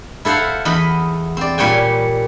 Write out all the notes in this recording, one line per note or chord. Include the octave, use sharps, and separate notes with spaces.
E4 A4 C5 F5 F#5
E2 D#5 B5
C4 D5
A#2 G3 C#5 G5 G#5